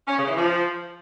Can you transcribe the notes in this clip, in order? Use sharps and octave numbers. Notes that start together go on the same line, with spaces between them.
C#4
C#3
E3
F3